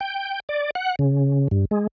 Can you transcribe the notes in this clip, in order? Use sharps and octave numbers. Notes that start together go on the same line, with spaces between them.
G5
D5
F#5
C#3
G2
G#3